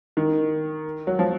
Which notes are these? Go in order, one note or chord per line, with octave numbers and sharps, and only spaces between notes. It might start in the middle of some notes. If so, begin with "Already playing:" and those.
D#3
F#3
F3